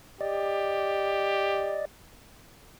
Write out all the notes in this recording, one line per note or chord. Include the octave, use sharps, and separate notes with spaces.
G4 D5 D#5